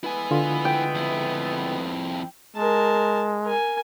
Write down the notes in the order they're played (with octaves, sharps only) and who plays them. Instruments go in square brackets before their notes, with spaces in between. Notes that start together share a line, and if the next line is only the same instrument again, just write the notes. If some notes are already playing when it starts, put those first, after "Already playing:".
[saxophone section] G#3 A3 B3 [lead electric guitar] E4 G#5
[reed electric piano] D3 F4
[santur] G5
[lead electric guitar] F2 E4
[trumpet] G#3 [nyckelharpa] A#4 A5
[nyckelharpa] A#4 G#5